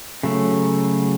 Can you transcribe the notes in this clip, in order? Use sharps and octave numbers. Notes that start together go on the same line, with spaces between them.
C#3 F#3 A3